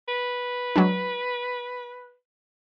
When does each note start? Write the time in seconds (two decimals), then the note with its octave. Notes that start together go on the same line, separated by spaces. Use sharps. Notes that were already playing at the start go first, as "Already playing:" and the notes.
0.08 B4
0.76 F#3 G#3 D4